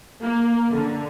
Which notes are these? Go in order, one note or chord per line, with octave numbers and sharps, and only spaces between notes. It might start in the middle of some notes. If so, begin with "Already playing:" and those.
A#3
D3